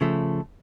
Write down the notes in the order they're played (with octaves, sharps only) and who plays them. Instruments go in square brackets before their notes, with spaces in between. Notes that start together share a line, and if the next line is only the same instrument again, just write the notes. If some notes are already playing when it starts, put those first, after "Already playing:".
[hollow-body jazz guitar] C#3 F3 A3